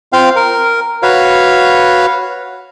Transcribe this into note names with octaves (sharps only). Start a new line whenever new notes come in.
C4 F4 F5 G5
A#4
F#4 B4 C#5 F5